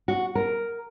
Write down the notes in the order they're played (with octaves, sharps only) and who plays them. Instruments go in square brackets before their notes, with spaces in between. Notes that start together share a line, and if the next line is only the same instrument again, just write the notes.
[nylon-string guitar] F#4
A#4